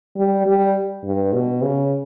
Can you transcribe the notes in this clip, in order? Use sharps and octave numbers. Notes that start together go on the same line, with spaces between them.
G3
G3
G2
B2
C#3